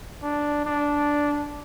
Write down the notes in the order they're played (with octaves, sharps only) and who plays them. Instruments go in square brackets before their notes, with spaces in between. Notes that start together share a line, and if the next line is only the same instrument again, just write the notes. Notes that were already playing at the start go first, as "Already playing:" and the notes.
[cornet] D4
D4